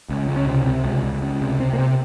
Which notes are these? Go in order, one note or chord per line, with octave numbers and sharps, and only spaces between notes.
C#2
C#2
C#4
C3 C4
C3
C#2
C#2
C#2
C3
C3 C4
A#3
C3 C4